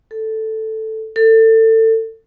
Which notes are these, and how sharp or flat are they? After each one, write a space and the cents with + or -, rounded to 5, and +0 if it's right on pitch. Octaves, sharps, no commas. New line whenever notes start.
A4 +0
A4 +25